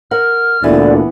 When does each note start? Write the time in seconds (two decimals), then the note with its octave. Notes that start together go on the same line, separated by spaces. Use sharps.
0.11 A#4 F#5 F6
0.63 D2 A#2 D3 E3 B3 D5